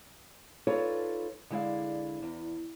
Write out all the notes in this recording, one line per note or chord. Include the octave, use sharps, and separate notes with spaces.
D#4 F4 A4 B4 C#5 D5
D3 G#3 E4 D5 F5
E2